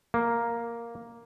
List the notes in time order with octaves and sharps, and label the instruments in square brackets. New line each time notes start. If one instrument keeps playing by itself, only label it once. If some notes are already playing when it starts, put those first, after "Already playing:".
[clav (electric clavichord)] A#3